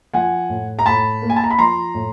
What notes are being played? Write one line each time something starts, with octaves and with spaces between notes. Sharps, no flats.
F3 F#5 G#5
A2
A#5
A2 A5 B5
A#3
G#5
A5
A#5
B5
F3 A#5 C6
A2